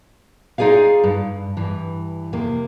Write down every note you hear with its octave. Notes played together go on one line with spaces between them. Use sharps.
D#4 F4 G#4 D5 F5
G2
G2 E3
F2 C3 A#3